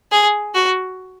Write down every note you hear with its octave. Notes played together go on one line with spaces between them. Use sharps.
G#4
F#4